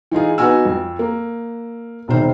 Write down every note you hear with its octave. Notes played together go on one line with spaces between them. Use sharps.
E3 D#4 F4 G#4
B3 D#4 F#4 G#5 E6
F2 F3
A#3
E1 C3 D#3 C5